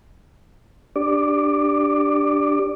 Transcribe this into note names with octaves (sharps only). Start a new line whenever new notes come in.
D4 G4 D5 D6